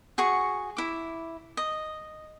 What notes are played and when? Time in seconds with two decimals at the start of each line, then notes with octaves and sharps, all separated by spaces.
0.18 F#4 G#4 C#6
0.77 E4 D6
1.57 D#5